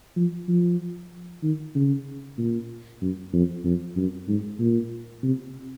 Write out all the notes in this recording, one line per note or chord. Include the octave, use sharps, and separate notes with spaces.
F3
F3
D#3
C#3
A#2
F#2
F2
F2
F#2
G#2
A#2
C3